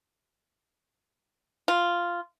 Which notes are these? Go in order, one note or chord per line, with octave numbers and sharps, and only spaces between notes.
F4